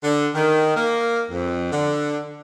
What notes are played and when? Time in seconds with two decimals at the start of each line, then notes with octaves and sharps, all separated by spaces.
0.04 D3
0.34 D#3
0.75 A#3
1.30 F2
1.71 D3